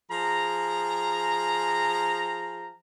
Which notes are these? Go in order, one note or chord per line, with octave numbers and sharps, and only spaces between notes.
F3 G#4 A#5